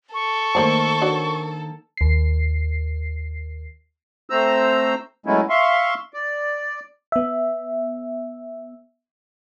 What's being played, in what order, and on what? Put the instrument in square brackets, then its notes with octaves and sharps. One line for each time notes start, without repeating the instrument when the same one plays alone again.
[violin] A4 [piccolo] C#6
[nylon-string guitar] D#3 A#3 C5 [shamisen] A3 D5 A5
[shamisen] D4 F#4 C#5
[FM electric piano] D#2 C7
[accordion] A3 C4 C5 A#5 E6
F#3 G#3 A3 B3 C#4 E4
E5 F5 C6 C#6
D5
[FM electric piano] B3 E5